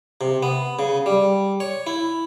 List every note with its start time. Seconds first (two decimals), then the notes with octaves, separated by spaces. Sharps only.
0.21 C3
0.43 B3
0.79 C#3
1.06 G3
1.60 C#5
1.87 E4